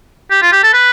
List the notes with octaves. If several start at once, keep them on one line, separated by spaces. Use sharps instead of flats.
G4
F4
G4
A4
B4